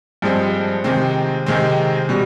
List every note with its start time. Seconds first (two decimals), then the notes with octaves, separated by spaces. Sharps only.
0.22 G2 F3 G#3 C4
0.84 C3 D#3 G#3 C4
1.46 C3 D#3 G#3 C4
2.09 B2 G3